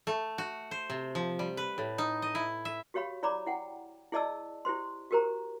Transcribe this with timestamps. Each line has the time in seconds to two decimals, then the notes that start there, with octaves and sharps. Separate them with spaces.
0.07 A3
0.38 F#4
0.71 C5
0.90 C3
1.15 F3
1.39 G3
1.57 B4
1.78 A2
1.98 D#4
2.22 D#5
2.35 E4
2.65 E5
2.94 F#4 G4 C#5 F5 B5
3.23 E4 C#5 D5 A#5 B5 D6
3.46 E4 F#5 G5
4.12 E4 G#4 D5 D#5 A5 E6
4.65 E4 G4 C5 C6
5.11 F#4 G4 A#4 C5 A#5